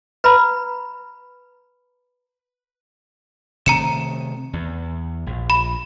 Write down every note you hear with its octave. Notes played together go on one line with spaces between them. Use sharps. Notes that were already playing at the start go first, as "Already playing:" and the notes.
B4 A#5 B5
C3 D#3 A3 A#5 C#7 E7
E2
A#1
B5